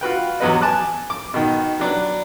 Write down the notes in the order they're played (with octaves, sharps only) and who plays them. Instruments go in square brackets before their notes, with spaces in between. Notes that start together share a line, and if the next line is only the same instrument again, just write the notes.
[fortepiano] F4 F#4 B4 G5
E2 F#3 B3 B4 D#5
G#5 A5 D6 F#6
D6
B2 D#3
F#3 D4 B4